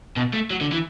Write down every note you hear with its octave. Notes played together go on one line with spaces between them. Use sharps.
B2
A3
F#3
D3
E3